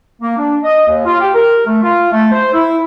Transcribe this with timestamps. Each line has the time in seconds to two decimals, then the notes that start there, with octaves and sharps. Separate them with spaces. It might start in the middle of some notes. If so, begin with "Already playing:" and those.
0.22 A#3
0.37 D4
0.63 D#5
0.87 D#2
1.05 F4
1.20 G4
1.34 A#4
1.66 A3
1.82 F4
2.11 A3
2.32 C5
2.53 E4